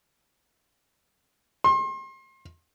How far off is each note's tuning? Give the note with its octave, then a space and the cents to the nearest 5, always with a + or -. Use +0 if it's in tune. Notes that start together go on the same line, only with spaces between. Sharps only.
C6 +35